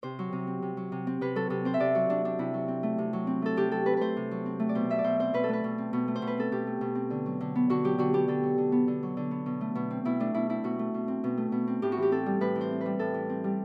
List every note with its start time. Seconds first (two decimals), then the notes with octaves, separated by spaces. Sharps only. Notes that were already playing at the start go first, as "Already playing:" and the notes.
0.03 C3 C5
0.19 F#3
0.33 C3
0.47 C4
0.62 C3
0.77 F#3
0.92 C3
1.07 C4
1.21 C3 B4
1.35 F#3 A4
1.50 C3 A4
1.65 C4 C5
1.74 E5
1.80 C3 D5
1.95 F#3 F#4
2.09 C3 D4
2.25 C4 D4
2.39 C3 E4
2.54 F#3
2.68 C4
2.83 A3
2.98 C3
3.13 F#3
3.27 C4
3.42 A3 A4
3.56 C3 G4
3.72 F#3 A4
3.86 C4 B4
3.97 A3 B4 C5
4.17 C3
4.31 F#3
4.46 C4
4.60 A3
4.69 D5
4.75 B2 C5
4.90 A3 E5
4.99 D5
5.04 B2 C5
5.19 C4 C5
5.34 B2 B4
5.44 A4
5.49 A3 B4
5.64 B2
5.78 C4
5.93 B2
6.08 A3
6.16 C5
6.22 B2
6.27 B4
6.38 C4 A4
6.52 B2 G4
6.67 A3
6.81 B2
6.95 C4
7.11 D3
7.26 F#3
7.41 D3
7.55 B3
7.70 D3 F#4
7.84 F#3 G4
7.98 D3 F#4
8.13 B3 G4
8.28 D3 A4
8.43 F#3
8.58 D3
8.72 B3
8.88 D3
9.03 F#3
9.17 D3
9.31 B3
9.46 B2
9.61 A3
9.75 B2
9.91 C4
10.05 B2 E4
10.20 A3 D4
10.34 B2 E4
10.49 C4 E4
10.64 B2 F#4
10.79 A3
10.94 B2
11.08 C4
11.24 B2
11.37 A3
11.52 B2
11.67 C4
11.82 A2 G4
11.92 F#4
11.97 E3
12.02 G4
12.12 C4 A4
12.26 G3
12.41 A2 B4
12.55 E3
12.61 C5
12.71 C4
12.81 B4
12.86 G3
12.99 A2 A4
13.14 E3
13.29 C4
13.44 G3